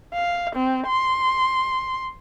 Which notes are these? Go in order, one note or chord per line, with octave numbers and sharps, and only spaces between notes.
F5
C4
C6